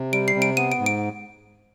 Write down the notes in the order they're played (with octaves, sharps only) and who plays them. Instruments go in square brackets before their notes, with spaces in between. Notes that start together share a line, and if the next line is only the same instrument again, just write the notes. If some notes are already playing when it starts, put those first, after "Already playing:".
Already playing: [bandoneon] C3
[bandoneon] G3 [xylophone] D7
[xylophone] C7
[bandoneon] C3
[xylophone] D7
[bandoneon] B3 [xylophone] D#7
[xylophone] D7
[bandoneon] G#2
[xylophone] D7